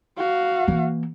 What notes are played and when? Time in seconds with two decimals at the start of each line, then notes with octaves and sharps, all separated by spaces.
0.18 F#4 F5
0.68 E3 A#3